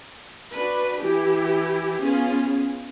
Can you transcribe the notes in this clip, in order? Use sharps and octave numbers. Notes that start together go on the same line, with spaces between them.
D4 F#4 B4
E3 E4 G4
B3 C#4 F4 G#4